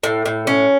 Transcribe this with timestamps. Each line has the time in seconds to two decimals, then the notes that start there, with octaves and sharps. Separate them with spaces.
0.03 A2
0.26 A2
0.47 C#4